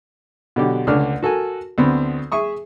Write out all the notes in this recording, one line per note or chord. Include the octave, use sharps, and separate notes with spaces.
B2 D3 F#3 G4
C#2 D3 A3 D4 F6
F#4 A4 A#4 G#5
D2 B3 C4
G#4 E5 C#6 D#6